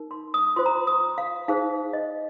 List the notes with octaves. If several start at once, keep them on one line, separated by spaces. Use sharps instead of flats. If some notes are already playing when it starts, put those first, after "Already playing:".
Already playing: D#4 A#4
C6
D#6
F4 C5 C6
A#5
C6
D#6
F5
D#4 G#4 C5 F5
D#5